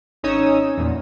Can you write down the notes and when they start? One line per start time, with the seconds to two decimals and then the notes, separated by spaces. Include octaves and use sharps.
0.23 G#1 C#4 D#4 C#5 D#6 E6
0.78 E2 A#2